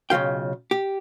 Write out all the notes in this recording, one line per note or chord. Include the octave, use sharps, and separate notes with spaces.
B1 C#3 E3 F4 G5
G4